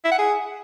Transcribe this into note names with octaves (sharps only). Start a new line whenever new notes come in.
E4
F#5
G#4